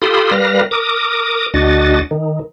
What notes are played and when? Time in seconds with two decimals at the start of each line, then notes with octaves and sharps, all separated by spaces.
0.02 F4 G4 A4 B5 C6 D#6
0.31 G3 A#4 B4 F5 A#6
0.71 A#4 D6 D#6
1.54 D2 D4 F#4 D#5 A6
2.11 D#3